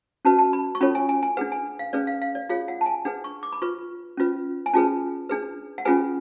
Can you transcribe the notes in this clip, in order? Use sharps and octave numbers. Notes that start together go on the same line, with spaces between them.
C#4 F#4 B4 A5
A5
B5
C#6
C#4 F4 A4 C#5 B5
G#5
G#5
G#5
D4 G#4 B4 F#5
G#5
F5
C#4 G#4 B4 D5
F5
F5
D5
F4 G#4 C#5 F5
F#5
A5
G#5
D4 G#4 B4 F#5
C#6
D6
B5
F4 B4 C#6
C#4 F4 B4
G#5
C#4 F4 G#4 B4 A5
D4 G#4 B4
F#5
C#4 F4 G#4 B4 G#5